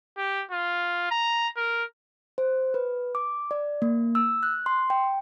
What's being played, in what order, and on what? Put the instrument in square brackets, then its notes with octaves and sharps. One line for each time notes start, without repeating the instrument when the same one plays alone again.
[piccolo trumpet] G4
F4
A#5
A#4
[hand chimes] C5
B4
D6
D5
A#3
E6
F#6
C6
G5